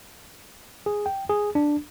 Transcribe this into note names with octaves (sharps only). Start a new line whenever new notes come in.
G#4
G5
G#4
D4